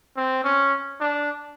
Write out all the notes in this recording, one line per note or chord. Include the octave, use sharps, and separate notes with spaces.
C4
C#4
D4